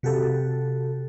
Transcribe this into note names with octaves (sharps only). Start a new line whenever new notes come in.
C3 F#4 G4 A4